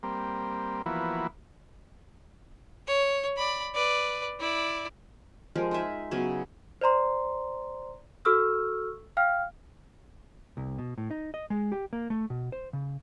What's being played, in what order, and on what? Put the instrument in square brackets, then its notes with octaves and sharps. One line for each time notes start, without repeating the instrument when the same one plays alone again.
[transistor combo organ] G3 A#3 C4
E3 F3 A#3 B3 E4 F#4
[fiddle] C#5
D5 B5
B4 D5
E4 D5
[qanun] F3 G#3 G4 A#4
D#4 G#4 E5
C#3 F#3 B3
[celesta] C5 D5 A#5 C6
F#4 A4 C#6 E6 F6
F5 G5 F6
[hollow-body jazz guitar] C2
B2
A2
D#4
D#5
G#3
G4
A#3
A3
B2
C5
C#3